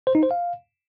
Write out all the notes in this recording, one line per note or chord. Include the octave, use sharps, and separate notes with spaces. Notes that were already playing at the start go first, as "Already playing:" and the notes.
C5
D#4
C5
F5